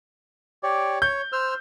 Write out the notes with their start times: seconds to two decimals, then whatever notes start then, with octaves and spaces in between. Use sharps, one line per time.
0.63 G4 C#5 D5
1.02 C#5 G6
1.32 C5 E6 F6